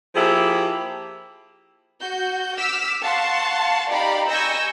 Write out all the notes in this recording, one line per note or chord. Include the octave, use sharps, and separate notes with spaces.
F3 A#3 E4 G4 G#4
F#4 G6
D6 E6 F6 B6
F5 F#5 A5 C6 C#6
D#4 G4 D5 F5 A#5 B5
D#5 G#5 C#6 E6 G6 A#6